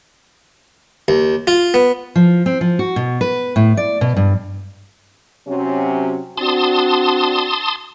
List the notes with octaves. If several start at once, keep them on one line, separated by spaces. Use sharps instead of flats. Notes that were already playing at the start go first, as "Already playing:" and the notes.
D#2
F4
B3
F3
C4
F3
F#4
B2
B4
A2
D5
B2
G2
C3 F#3 C#4
C4 D4 F#4 A5 C6 D#6